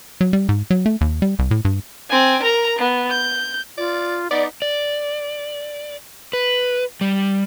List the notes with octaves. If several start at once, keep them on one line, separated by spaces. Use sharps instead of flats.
F#3
G3
G#2
F#3
A3
D#2
G3
C2
A2
G2
C4 G#5
A#4 A#5
B3
G6
F4 D5
B3 D#4 D5
D5
B4
G3